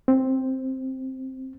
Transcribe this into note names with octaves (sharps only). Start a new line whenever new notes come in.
C4